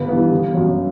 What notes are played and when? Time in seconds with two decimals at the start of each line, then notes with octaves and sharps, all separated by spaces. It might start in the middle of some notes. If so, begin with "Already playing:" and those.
Already playing: G1 B4
0.09 G2 E3 B3
0.32 G1
0.54 F#2 F#3